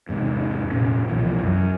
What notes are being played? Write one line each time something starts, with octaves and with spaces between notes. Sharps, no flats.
E2 G#2 C3
F1 A#2 C#4
C2 B2 E3 F3
F#2